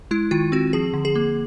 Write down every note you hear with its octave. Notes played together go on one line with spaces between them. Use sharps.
G#3 E4
D#3 F4
C4 F#4
F3 G#4
D3
G#4
A#3